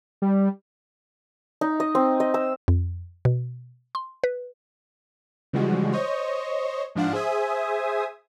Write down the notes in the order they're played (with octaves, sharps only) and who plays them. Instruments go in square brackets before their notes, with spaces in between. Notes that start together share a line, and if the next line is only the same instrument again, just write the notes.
[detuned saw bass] G3
[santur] D#4
D#5
C4
D#5
E6
[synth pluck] F2
B2
C6
B4
[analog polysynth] C#3 E3 F3 G3 G#3 F#4
C5 C#5 D#5 C#6
G#2 F3 D4 F5 F#5
G#4 C5 E5 G#5 D#6